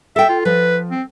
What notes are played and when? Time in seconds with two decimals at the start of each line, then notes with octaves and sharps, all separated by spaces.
0.16 A4 E5 G5
0.29 F4
0.45 F3 B4
0.91 C4